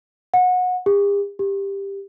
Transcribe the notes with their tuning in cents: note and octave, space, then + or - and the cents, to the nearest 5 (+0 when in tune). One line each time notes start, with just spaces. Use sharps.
F#5 -25
G4 +45
G4 +15